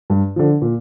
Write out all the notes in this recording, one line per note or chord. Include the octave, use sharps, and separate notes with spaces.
G2
D3 F3
A#2